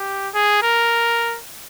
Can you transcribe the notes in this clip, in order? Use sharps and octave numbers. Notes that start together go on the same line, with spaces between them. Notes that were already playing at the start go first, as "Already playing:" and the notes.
Already playing: G4
G#4
A#4